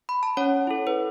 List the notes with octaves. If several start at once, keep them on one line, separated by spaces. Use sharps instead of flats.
B5
A5
C#4 C#5 F#5
E4 A4
B4